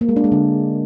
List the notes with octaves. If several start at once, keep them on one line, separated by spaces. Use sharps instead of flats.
A#3
G#3
D4
G#3
D3